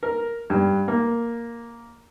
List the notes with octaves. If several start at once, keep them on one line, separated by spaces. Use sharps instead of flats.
A#4
G2
A#3